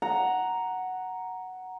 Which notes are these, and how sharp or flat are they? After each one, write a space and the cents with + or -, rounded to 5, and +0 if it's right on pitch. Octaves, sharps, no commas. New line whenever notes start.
F#5 +0 A#5 +0